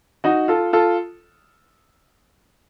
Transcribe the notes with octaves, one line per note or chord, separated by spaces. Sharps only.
D#4 F#4
F4 A4
F4 A4